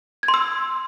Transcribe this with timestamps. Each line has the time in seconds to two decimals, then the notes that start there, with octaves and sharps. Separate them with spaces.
0.23 G#6
0.28 C6
0.34 E6